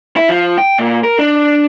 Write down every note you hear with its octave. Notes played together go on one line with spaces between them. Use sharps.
E4
F3
G5
A#2
A#4
D4